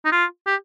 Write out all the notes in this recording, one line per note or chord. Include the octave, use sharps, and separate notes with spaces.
D#4
F4
G4